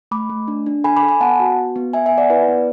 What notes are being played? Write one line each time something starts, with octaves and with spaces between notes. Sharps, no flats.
A3 B5 D6
A3
D4
D4
A4 G#5 B5
B5 D6
A4
G#5 B5
B3 F#5 A5
F#4
B3
B3
B3 E5 G#5
E5 G#5
B3
D5 F#5
E4 B4 D5
B3